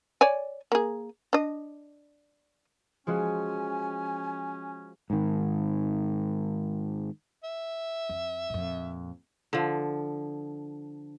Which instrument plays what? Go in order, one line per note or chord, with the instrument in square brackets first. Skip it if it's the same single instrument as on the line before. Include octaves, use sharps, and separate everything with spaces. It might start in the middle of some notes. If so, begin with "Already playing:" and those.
[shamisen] C#5 D5 G#5
A#3 G#4
D4 D#5
[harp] F3 G#3 F#4 [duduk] C#4 [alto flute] G#5
[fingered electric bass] G#2 D#3
[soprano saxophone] E5
[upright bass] F2
F2 A#2
[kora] D3 F3